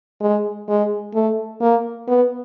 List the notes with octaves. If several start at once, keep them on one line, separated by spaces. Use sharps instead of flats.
G#3
G#3
A3
A#3
B3